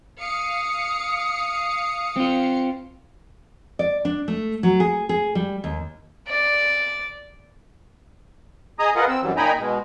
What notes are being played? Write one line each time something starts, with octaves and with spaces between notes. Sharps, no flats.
F5 D#6 C#7
C4 F4
D5
D4
A3
F#3
G#4
G#4
G3
D#2
D5
G#4 D#5 G#5 A#5 D#6
F4 G#4 A#4 B4 D#5 F#5
C4 E6
F#2 E3 F#3 G3
A#2 D#4 G5 G#5 A#5 B5
B2 G#3